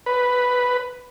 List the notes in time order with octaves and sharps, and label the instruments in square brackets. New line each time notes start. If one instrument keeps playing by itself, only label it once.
[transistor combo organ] B4